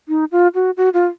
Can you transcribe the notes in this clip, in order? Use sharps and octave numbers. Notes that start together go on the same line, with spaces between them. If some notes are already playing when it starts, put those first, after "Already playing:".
D#4
F4
F#4
F#4
F4